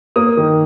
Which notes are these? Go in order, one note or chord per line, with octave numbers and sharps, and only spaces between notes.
A#3 D#6
D#3